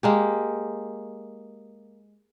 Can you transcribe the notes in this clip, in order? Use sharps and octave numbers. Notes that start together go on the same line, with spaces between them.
G#3 A#3 G4